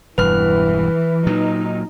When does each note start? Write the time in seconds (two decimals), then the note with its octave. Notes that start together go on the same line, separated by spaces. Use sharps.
0.18 E1 G2 E3 B4 F6
1.27 A#2 F#3 D#4